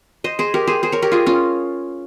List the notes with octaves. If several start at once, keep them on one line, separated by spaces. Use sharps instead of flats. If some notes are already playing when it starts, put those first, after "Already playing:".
C5 D#5
G#4 C5
G4 A#4
G#4 C5
G#4 C5
A#4 C#5
G4 A#4
F4 G#4
C#4 F4